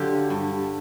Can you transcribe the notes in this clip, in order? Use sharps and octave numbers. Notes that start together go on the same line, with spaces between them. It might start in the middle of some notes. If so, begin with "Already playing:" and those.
Already playing: D3 F#3 F4 G4
G2